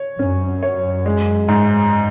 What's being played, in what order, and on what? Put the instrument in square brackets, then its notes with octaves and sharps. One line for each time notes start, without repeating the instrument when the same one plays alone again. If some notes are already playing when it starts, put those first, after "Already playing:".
Already playing: [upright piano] C#5
[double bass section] F#2 [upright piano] C#4
[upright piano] C#5
G#3
G#2